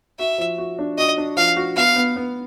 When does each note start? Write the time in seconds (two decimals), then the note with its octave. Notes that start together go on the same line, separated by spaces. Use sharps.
0.19 F#4 E5
0.38 F3
0.58 F#4
0.78 D4
0.98 F#4 D#5
1.18 D4
1.37 F3 F5
1.56 F#4
1.76 B3 F5
1.96 B3
2.16 B3